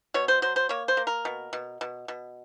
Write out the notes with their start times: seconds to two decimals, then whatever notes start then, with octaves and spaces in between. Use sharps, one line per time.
0.14 B2 C#5
0.28 C5
0.42 F#3 C5
0.56 C5
0.69 A#3 C#5
0.88 C5
0.97 A#3
1.07 A#4
1.25 B2
1.53 B2
1.81 B2
2.08 B2